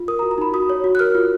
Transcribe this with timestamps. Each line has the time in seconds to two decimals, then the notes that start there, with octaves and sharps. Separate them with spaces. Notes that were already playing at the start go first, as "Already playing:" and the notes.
Already playing: F4
0.08 A#4 D#6
0.19 A#5
0.23 F#4
0.31 A#5
0.38 D#4 B5
0.54 F#4 D#6
0.70 C#5
0.84 F#4
0.95 F#6
0.99 A#4 F6
1.15 F4